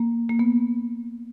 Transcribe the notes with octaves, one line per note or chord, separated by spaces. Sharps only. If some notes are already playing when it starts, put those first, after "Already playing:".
Already playing: A#3
A#3
B3